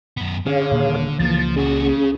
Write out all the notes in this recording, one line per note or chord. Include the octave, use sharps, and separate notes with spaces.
F#2 B3
D3 C#4 G#4 C#5 F5
D#1 A#2
C#2 E3 F3 A#3 A6
A#2 C#4 F#4 G#4
C#3